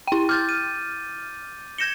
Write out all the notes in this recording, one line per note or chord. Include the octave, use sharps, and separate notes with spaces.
E4 G5
D6 F6 G6 A6
D#7
G6 G#6 A#6 C#7 E7 G7